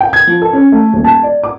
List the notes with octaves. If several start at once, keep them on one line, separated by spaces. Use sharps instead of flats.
G5
G#6
F3
A4
C#4
A3
D#1
A5
D5
D6